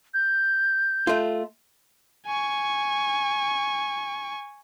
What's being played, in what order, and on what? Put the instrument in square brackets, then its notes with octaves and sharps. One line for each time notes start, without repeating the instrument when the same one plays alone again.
[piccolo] G6
[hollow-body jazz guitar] A3 F4
[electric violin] G#5 C#6